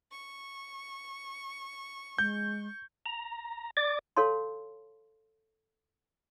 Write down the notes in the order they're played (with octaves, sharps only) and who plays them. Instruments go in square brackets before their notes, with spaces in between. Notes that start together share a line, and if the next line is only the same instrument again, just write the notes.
[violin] C#6
[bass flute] G#3 [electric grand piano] G6
[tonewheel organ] A#5
D5 D6
[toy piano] A4 C#5 F5 A5 C6